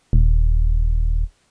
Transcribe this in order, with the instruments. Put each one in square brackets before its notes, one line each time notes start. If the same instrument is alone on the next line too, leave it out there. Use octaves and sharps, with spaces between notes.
[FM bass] D#1